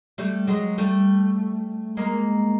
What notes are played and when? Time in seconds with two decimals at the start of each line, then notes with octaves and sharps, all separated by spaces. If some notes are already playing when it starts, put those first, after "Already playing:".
0.18 G3 A3
0.47 F#3 G#3
0.78 G3 A3
1.97 G#3 A#3